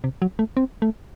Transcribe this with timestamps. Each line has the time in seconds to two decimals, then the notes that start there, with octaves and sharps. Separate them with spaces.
0.04 C3
0.22 F#3
0.39 A3
0.57 C4
0.82 A3